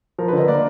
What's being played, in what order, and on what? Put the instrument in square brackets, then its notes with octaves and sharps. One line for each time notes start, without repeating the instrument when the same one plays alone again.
[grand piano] F3 [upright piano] A#4
[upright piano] B4
[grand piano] D3 [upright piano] D#5
[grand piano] A#3 [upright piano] D5